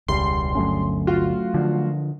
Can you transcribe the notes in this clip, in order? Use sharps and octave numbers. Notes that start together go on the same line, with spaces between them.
E1 C#2 G3 C6
G1 D2 F#3 A3 C#4
F4 F#4
D3 F3